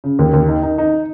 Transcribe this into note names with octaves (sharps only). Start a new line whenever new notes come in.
C#3
D#2
D#2
D#4
D#4
D#4